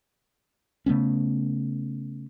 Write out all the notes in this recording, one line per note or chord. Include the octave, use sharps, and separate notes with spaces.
C#3 A3 B3 C#4